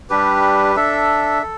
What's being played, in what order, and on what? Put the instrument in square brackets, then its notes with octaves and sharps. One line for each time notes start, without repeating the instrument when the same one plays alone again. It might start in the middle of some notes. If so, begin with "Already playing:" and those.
[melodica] G3 D4 G4 B4
D4 A4 E5
A4